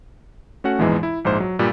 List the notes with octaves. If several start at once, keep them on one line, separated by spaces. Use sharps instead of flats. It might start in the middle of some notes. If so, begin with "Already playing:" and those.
A3 C#4 F#4 F#5
A#1 E2 G#2 E3 G#3
E4
A#1 G#2 C5
F#3
G2 A#2 G3